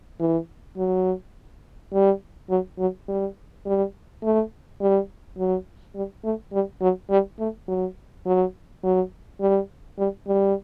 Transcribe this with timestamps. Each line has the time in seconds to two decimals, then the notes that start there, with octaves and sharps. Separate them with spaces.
0.20 E3
0.77 F#3
1.93 G3
2.50 F#3
2.79 F#3
3.08 G3
3.66 G3
4.23 A3
4.81 G3
5.38 F#3
5.95 G3
6.24 A3
6.53 G3
6.81 F#3
7.10 G3
7.39 A3
7.68 F#3
8.26 F#3
8.84 F#3
9.41 G3
9.99 G3
10.28 G3